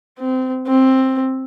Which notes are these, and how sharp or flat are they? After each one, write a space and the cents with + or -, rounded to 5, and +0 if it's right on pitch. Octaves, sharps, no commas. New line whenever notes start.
C4 -20
C4 +10